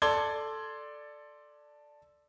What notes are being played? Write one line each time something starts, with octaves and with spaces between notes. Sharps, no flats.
A4 D5 C6 G#6 G7